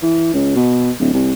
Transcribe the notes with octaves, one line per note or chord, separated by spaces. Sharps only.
E3
C#2
B2
D1
C2